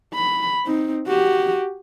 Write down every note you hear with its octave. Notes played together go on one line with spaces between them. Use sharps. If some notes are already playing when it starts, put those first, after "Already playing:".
B5
C4 D#4
F#4 G4